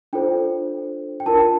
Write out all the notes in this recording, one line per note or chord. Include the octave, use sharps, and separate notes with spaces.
D4 F4 A4 C5 G5
G5
D4 F4 A#4 A5